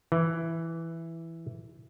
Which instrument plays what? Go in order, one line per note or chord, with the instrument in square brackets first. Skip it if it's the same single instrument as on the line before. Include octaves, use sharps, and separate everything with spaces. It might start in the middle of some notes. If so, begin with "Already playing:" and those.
[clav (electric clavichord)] E3